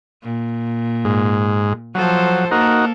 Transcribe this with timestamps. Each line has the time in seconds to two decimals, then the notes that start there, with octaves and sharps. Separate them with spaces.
0.23 A#2
1.05 G#2
1.95 F3 F#3 A4 C5
2.51 A#3 D#4 F#4 A4 A#4